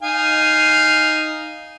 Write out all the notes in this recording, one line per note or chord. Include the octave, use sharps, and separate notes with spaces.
D#4 F5 G#5